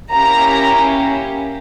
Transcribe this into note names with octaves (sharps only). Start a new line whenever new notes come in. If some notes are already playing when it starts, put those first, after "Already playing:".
A#3 C#4 E4 G4 A#5